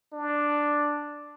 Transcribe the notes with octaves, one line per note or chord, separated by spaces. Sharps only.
D4